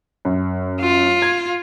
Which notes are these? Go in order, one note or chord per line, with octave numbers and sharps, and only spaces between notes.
F#2
F4
G#6